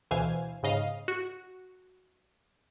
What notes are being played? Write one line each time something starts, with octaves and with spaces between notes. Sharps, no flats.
D2 B2 E3 C5 F5 G#5
G#2 C#3 D#5 F5
F#4